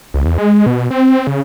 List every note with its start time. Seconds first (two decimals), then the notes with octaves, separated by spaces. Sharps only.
0.14 C#2
0.25 E2
0.38 G#3
0.66 B2
0.91 C4
1.27 C#3